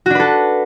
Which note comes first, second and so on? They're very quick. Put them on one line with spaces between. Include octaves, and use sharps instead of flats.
F#4 D4 B4 A4